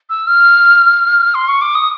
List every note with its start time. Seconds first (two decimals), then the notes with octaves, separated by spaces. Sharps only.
0.10 E6
0.27 F6
1.35 C6
1.48 C#6
1.61 D6
1.75 D#6